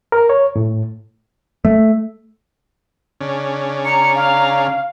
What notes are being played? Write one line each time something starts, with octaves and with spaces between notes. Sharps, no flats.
A#4
C#5
A2
A3
C#3 C#4 D4
A#5 C#7
F5